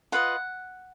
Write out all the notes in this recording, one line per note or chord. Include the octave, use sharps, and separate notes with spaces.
F4 B4 D#5 F#5